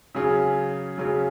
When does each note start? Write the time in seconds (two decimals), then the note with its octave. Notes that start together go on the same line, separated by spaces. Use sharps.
0.15 C#3 F#3 C#4 G#4
0.98 C#3 F#3 C#4 G#4